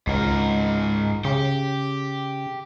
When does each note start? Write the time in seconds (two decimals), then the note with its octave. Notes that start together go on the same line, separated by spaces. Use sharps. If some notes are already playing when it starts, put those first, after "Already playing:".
0.07 C#2 G#2 A#4
1.25 C#3 G4